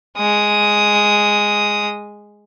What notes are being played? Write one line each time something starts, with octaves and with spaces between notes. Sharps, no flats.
G#3 D#6